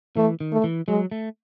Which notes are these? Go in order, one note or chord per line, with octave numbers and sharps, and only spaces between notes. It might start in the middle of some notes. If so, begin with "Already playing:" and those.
E3 A3
D#3
A3
E3
F#3 G#3
A3